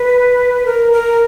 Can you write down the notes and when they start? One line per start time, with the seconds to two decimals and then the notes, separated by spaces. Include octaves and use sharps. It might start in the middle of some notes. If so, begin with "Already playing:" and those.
Already playing: B4
0.66 A#4
0.92 A#4